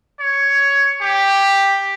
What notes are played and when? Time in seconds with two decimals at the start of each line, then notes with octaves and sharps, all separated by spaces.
0.20 C#5
1.01 G4